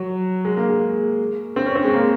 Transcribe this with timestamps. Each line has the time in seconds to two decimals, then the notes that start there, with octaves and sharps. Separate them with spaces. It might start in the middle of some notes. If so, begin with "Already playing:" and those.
Already playing: F#3
0.45 G#3
0.57 A#3
0.69 G#3
1.56 C4
1.66 C#4
1.75 C4
1.84 G#3
1.94 A#3